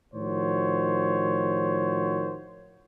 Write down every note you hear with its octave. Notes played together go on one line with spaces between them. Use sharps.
A2 D#3 F3 F#4 C5 C#5